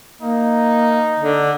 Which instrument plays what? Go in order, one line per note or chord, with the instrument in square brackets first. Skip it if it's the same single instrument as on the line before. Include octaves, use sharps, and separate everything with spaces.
[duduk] A#3 [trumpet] D#4
[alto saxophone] D3